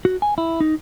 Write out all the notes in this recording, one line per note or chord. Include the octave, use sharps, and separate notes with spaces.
F#4
G#5
E4
D#4